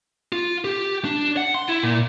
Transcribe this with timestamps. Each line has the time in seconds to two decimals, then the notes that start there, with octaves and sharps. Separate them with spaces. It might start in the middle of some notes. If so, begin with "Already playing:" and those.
0.32 F4
0.65 G4
1.05 D4
1.37 F#5
1.54 C6
1.68 E4
1.83 A#2